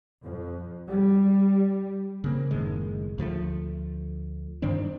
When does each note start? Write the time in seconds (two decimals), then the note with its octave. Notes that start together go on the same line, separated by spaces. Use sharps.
0.23 F2
0.88 G3
2.24 C#3 A#3 C4
2.51 F#1 A2 D#3 G#3
3.18 D2 F3 F#3 A3
4.62 G2 D#3 C4 D4